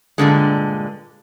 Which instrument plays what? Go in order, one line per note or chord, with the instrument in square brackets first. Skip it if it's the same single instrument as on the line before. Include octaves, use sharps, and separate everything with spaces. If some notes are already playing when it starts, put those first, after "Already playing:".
[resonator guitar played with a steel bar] G2 A#2 D3 G#3